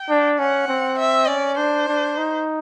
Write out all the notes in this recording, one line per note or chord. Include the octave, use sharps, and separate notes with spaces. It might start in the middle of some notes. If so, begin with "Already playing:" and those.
Already playing: G5
D4
C#4 F#5
C4
E5
C#4 D5
D4 C5
D4
D#4